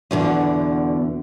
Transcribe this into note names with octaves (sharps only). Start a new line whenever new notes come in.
E2 B2 D3